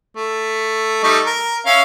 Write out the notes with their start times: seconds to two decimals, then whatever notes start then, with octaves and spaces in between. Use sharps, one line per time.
0.17 A3
1.03 G3 A3 D#4
1.26 A#4
1.66 C#4 E5 F5